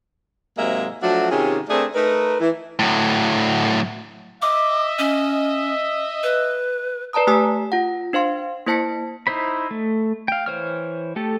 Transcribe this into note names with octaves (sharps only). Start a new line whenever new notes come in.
G#2 C3 F#3 G#3 A#3 E5
F3 F#3 A3 D4 F#4
C3 D#3 C#4 F4 G4 G#4
A3 C4 D4 G#4 A#4
A3 D#4 A#4 B4
E3
A2 F#3
D#5 E5 D6
C#4
B4
B4 D5 A5 A#5 D#6
A3 G4 G#5 D#6 E6 B6
F4 F#5
D4 C5 F5 C6
A#3 E4 C5 A5 B6 C#7
D#4 E4 C5 B5
A3
F5 G5
E3 C5 C#5 F6
A3 G4 A4